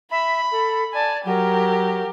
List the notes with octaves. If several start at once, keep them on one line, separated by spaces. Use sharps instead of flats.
E5 B5
A4
D5 G#5 A5
F#3 G4 A#4